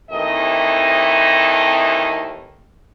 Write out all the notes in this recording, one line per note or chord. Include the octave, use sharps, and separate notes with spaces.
D#2 E3 A3 C4 D#5